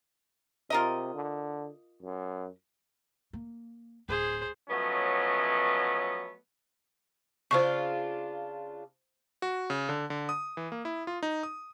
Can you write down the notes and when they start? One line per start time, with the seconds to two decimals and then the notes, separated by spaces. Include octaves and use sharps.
0.70 C3 F4 A#4 D#5
1.14 D3
2.02 F#2
3.33 A#3
4.09 D1 G#4 C5
4.69 F3 F#3 A3 B3 C#4 D#5
7.51 C#3 D4 F4 C5 C#6
9.42 F#4
9.70 C#3
9.89 D3
10.10 D3
10.29 D#6
10.57 E3
10.72 A#3
10.85 E4
11.07 F4
11.23 D#4
11.43 D#6